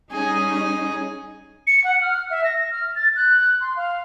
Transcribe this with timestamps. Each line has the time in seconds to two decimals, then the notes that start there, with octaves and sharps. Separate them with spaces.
0.12 G3 C#4 D#4 G#4
1.67 C#7
1.84 F#5
2.02 F6
2.31 E5
2.44 A#6
2.71 F6
2.96 A6
3.16 F#6
3.61 C6
3.76 F5